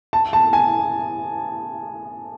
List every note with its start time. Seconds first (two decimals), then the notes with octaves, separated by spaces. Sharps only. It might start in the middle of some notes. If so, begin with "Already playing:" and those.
0.13 A5
0.33 A5
0.53 G#5